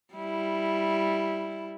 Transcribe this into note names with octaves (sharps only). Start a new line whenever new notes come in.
G3 E4